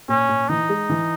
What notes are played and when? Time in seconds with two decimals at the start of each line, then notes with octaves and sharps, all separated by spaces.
0.08 A#2 C#4
0.29 A#2
0.49 E3 D#4
0.69 G#3
0.90 E3